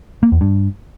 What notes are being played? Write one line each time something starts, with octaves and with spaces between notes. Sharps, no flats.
A#3
E2
G2